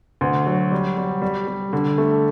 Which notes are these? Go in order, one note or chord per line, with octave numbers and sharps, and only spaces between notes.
D2
F#3
G3
G3
G3
G3
D3
A3